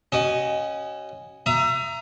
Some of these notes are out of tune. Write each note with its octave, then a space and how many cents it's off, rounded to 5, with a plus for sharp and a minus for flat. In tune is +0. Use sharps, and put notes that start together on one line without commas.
C#4 -10 F#4 +35 D#5 +0
E5 +35 A#5 +0 D#6 +25